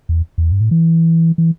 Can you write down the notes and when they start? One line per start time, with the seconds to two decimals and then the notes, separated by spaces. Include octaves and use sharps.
0.09 E2
0.38 E2
0.52 G2
0.61 A2
0.71 E3
1.38 E3